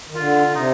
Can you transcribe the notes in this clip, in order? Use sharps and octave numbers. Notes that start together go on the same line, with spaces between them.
D#3
D3 F4
D3
C3 D#4